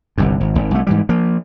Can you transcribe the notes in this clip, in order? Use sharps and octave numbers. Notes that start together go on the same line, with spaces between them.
G1 C2 G2
G#1
G#1
C2 A3
G#2 E3 G3
F3 A#3